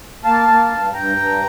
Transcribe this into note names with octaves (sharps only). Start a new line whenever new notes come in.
A#3 F5 A5
A#3
G2
G2 G5 A#5
G2